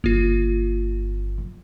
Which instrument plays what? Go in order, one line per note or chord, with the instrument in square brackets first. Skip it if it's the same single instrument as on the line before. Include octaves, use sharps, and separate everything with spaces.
[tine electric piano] G1 [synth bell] A#3 F4